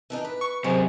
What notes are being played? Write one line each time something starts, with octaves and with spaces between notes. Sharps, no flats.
E3 D4 D#4
B4
C#6
F#2 C3 G#3 C5